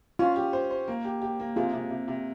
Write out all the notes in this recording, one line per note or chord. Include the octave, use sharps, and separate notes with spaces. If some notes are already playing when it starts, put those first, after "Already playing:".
C#4 F4
G4
C5
C5
A#3
G4
G4
A#3
C3 F4 G#4
C3
C3
C3